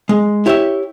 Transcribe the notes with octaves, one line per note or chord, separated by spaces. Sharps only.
G#3
E4 G4 C#5 E5